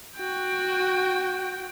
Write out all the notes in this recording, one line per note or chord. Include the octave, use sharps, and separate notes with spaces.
F#4 G5